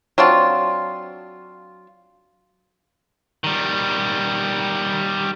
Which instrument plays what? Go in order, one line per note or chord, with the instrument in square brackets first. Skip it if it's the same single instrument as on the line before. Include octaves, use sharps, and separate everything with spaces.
[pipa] F#3 C4 D4 F4
[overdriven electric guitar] D#3 G3